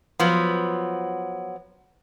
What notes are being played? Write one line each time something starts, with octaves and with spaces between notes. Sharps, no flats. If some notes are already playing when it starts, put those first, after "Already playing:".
F3 F#3 B3